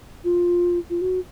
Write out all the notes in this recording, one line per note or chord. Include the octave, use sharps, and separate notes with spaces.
F4
F4
F#4